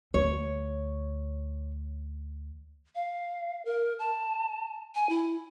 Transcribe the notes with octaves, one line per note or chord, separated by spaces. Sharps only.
D2 C#5
F5
A#4
A5
G#5
E4